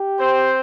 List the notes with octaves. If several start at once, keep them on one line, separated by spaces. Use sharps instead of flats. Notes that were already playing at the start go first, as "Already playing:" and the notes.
Already playing: G4
C4 C5